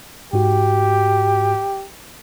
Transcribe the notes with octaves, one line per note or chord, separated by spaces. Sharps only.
G#2 F#4 G4